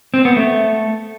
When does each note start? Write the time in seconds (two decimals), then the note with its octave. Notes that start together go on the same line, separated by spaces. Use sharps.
0.14 C4
0.25 B3
0.37 A3